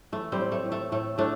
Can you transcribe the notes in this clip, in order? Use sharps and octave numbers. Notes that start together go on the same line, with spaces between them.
E3 A3
G3 C4
A2
A3
A2
A3
A2 A3
A2 A3 D4